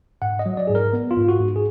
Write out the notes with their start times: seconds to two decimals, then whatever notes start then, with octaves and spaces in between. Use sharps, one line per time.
0.22 G#2 F#5
0.39 D#5
0.46 F#3
0.57 D5
0.67 G#2 G#4
0.75 A#4
0.93 B3
1.11 F4
1.17 G#2
1.28 F#4
1.40 G#2
1.56 G#4